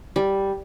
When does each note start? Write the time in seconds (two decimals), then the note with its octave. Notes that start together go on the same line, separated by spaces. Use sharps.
0.16 G3